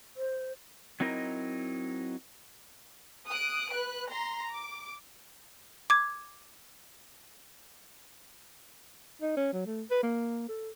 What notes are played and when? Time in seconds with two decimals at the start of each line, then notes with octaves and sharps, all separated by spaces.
0.17 C5
1.00 F#3 C4 D#4 E4 A#4 D#5
3.28 D#6 F#6 D7
3.69 B4 F#6
4.09 A#5 C6
4.52 D6
5.90 D6 G#6
9.22 D#4
9.37 C#4
9.53 F#3
9.66 A3
9.91 B4
10.03 A#3
10.49 A4